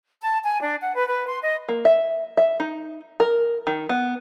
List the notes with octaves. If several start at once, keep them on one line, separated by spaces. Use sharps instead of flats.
A5
G#5
D4
F#5
B4
B4
C6
D#5
A#3
E5
E5
D#4
A#4
D#3
B3